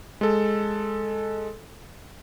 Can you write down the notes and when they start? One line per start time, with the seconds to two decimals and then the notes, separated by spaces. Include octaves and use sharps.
0.21 G#3 A4